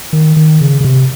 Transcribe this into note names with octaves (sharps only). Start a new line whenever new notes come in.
D#3
D#3
C#3
C#3
C3